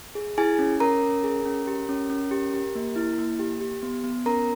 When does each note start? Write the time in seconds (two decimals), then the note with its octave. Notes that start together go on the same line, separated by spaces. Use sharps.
0.15 G#4
0.38 E4 G#4 G#5
0.59 C#4
0.80 C#4 A#4 A#5
1.03 C#4
1.24 G#4
1.46 C#4
1.67 G4
1.89 C#4
2.10 C#4
2.31 G4
2.54 G4
2.75 A#3
2.96 E4
3.18 A#3
3.39 G4
3.61 G4
3.83 B3
4.04 B3
4.26 C#4 A#4 A#5